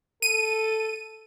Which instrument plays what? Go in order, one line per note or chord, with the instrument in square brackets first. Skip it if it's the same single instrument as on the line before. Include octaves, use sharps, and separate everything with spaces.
[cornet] A4 [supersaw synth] D#7